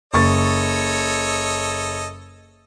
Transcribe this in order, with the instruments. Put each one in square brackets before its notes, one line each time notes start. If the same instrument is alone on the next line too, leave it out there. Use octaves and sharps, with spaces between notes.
[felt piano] F#1 C#6 A6 [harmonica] A4 C#5 D#5